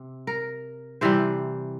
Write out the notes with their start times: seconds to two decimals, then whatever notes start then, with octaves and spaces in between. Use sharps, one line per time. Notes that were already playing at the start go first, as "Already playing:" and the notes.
Already playing: C3
0.27 A#4
1.01 C3 E3 G3 C5